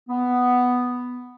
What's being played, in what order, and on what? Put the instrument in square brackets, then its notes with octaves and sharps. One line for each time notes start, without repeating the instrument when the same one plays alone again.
[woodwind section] B3